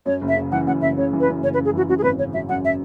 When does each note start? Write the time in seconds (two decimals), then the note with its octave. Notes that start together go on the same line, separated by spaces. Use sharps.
0.06 F#2 C#5
0.21 F#1
0.28 E5
0.36 C#3
0.52 E3 F#5
0.67 F#2 F#5
0.82 F#1 E5
0.97 C#3 C#5
1.13 E3
1.20 B4
1.28 F#2
1.42 F#1 C#5
1.54 B4
1.57 C#3
1.65 G#4
1.74 E3 F#4
1.89 F#2 F#4
1.98 G#4
2.03 G#1 B4
2.19 C#3 C#5
2.33 F#3 E5
2.49 F#2 F#5
2.65 E5